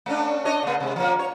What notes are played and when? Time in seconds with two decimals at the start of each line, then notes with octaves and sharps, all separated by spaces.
0.06 A3 C#4 D4
0.45 D4 C#5 D#5
0.63 C#3 A#3
0.80 C3 G#3
0.96 F3 A#3
1.19 C#5